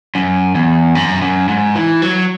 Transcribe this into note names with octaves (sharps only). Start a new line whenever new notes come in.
F#2
E2
F#2
F#2
G#2
E3
F#3